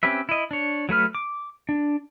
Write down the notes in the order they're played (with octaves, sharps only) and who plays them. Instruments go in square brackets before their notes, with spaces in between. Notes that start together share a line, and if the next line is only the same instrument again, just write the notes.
[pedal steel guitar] C4 C#4 G4 B4 E5
E4 D#5
D4 C#5
F#3 A3 B4 F6
D6
D4